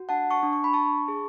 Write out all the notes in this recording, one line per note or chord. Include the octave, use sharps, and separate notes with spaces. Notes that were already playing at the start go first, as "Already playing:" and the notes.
Already playing: F#4
D4 F#5 A5
A5 C#6
D4
C#6
B5
D4 A5 C#6
G#4